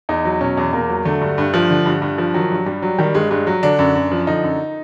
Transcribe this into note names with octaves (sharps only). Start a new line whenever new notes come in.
E2 D#4
F#3
B2 C#4
E2
E2 A#3
F#3
D3 A3
G2
G2
F3
D3
G2
G2
F3
D#3 F#3
G2
G2 G3
F#3
D#3 G3
G2 G#3
G2 G#3
F#3
D3 D4
F#2
F#2
F3
D3 D#4
F#2